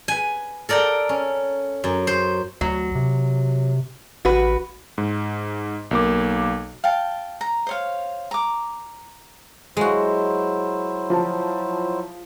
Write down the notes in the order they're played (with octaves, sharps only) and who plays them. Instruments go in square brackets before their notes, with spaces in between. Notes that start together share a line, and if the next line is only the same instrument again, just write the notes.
[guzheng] B4 G#5
A4 A#4 D5 G5 A#5
C#4
F#2
C5
[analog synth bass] D2 [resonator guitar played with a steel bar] F#3
[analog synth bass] C3
[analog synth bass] A1 [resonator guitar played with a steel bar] F#4 B4
[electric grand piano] G#2
B1 A#3 D6
[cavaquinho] F5 G5 A5
A#5
C5 C#5 F5
A#5 D6
[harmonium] F#3 E4 C5 [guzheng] G#3 F#4
[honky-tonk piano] F3 A5